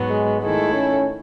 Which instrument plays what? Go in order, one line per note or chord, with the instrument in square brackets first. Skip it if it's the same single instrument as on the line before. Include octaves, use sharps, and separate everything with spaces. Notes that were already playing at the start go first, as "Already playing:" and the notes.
Already playing: [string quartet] G#2 F#3 B3
[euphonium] G#3
[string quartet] D#3 A3 E4 A4 [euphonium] G#3
[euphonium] C#4